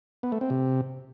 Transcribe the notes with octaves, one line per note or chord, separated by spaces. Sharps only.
B3
A3
C4
C3